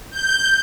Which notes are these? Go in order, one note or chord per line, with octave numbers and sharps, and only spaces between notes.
G6